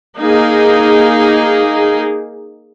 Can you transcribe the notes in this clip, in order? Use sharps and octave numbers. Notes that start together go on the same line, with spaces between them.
A#3 D#4 G#4